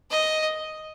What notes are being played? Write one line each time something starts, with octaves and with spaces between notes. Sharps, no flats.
D#5